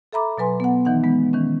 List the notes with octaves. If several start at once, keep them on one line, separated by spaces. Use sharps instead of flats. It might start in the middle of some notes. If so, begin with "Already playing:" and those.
A4 E5 A#5 B5 D6
B2 F#3 B4 G#5 C6
B3 F#5
D#3 E3 D#4 F#5
G#3 B3
D#3 E3 C#4